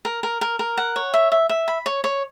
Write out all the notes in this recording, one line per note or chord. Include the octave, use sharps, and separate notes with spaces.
A#4
A#4
A#4
A#4
F#5
C#5
E5
E5
E5
B5
C#5
C#5